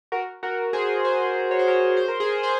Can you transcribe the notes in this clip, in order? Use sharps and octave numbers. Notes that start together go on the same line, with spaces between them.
F#4 A#4
F#4 A#4
G#4 C5
G#4 C5
C#5
C5
A#4 C#5
C5
A#4
G#4 C5
G#4 C5